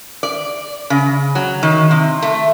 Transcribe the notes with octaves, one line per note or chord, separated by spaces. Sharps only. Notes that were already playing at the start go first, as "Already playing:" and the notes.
D5
C#3
F#3
D#3
C3
A3